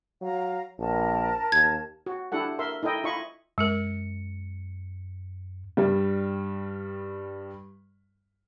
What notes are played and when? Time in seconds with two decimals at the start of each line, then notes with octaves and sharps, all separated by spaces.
0.22 F#3 F5 A#5
0.79 A#1 A#4 A5
1.52 D#2 G#6
2.06 F#4
2.32 D4 E4 G4 A4 F#5
2.59 A#4 E5 C6
2.83 D#4 E4 A4 D#5 G5
3.04 E4 F4 D#5 B5 C#6
3.58 F#2 G#3 A#4 C#7
5.77 G2 G3